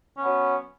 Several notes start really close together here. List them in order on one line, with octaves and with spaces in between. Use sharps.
C#4 B3 F#3